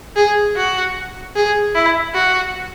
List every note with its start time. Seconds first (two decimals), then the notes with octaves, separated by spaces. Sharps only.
0.16 G#4
0.56 F#4
1.36 G#4
1.75 E4
2.14 F#4